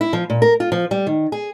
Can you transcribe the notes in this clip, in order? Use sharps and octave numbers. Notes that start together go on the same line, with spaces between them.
E4
F3
A#2
A#4
F4
F3
G3
D#3
G#4